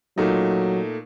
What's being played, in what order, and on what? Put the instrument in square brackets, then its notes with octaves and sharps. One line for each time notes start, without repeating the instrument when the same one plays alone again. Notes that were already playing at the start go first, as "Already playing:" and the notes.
[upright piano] A#2 A3 D#4 [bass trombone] F#3